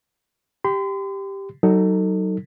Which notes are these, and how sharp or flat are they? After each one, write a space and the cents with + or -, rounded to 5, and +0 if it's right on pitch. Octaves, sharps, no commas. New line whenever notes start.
G4 +0 C6 -40
F#3 +30 D#4 +0 A4 +25